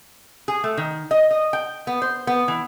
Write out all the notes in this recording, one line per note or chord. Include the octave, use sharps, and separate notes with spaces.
G#4
A3
D#3
D#5
D#5
G5
B3
C5
B3
E3